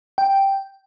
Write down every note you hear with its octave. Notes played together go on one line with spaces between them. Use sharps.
G5